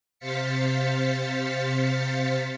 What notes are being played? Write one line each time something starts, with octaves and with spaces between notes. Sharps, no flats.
C3 C5 F5 A6 B6 C#7